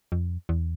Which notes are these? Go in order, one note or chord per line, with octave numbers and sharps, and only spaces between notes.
F2
E2